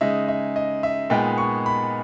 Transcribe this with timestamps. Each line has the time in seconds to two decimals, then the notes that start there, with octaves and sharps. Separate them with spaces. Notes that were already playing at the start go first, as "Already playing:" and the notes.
0.01 C#3 G#3 D#4 E5
0.28 E5
0.56 D#5
0.83 E5
1.10 A#2 G#3 B3 D#4 G5
1.38 C#6
1.66 B5